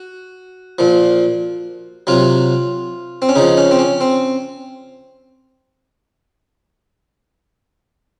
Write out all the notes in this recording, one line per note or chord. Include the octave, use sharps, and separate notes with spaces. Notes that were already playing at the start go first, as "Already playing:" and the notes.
Already playing: F#4
A#2 F3
C3 F#3 F4
C4
C#4
C#3 F3 D#4
C#4
C4
C#4
C4